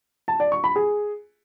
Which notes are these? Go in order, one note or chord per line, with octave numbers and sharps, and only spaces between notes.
A5
D5
C#6
B5
G#4